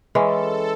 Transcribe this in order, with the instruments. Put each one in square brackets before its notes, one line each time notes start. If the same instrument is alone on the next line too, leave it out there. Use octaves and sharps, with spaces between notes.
[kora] E3 G#3 C#4 [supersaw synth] A4